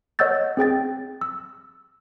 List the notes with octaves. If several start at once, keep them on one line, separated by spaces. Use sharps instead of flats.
C#5 D#5 F#5 E6 G6 A6
C4 G#4 G5 A6
E6